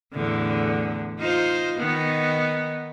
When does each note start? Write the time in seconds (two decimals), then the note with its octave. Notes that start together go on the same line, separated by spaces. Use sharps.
0.13 E2 A2 D3
1.19 D#4 F4 C5
1.79 D#3 B3 D#4